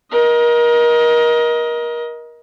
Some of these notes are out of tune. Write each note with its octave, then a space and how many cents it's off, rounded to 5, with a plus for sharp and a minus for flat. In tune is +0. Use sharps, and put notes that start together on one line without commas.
A#4 +30 D#5 +20